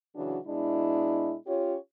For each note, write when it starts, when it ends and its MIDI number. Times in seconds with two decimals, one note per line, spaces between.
0.15 0.38 49
0.15 0.38 52
0.15 0.38 54
0.15 0.38 62
0.15 0.38 66
0.47 1.35 47
0.47 1.35 56
0.47 1.35 62
0.47 1.35 64
1.47 1.77 61
1.47 1.77 65
1.47 1.77 67
1.47 1.77 73